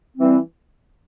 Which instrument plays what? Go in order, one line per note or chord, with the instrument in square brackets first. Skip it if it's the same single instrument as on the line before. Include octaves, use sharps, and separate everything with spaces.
[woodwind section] E3 G3 C4